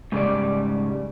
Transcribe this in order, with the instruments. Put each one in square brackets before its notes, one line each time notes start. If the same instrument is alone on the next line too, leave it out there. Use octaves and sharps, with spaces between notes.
[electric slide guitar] G#2 C#3 G3 D5